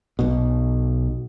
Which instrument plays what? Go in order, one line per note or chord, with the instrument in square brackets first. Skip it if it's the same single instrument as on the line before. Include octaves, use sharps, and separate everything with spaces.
[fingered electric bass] B1 B2